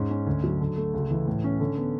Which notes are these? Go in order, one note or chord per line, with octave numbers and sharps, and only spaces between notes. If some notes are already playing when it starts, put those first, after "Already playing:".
Already playing: G#2 C#4
C#4
D2
F#3
D3
A3
C#2
E3
A2
C#4
D3
B3